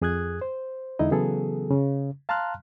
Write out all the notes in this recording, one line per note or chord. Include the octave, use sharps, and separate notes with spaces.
F2 G#4 D#6 F#6 G#6
C5
E2 D3 G#3 D#4 E4 D#5
C#3 E3 F#3 B3 G#4 A4
C#3
F5 A5 A#5 C6 F6 F#6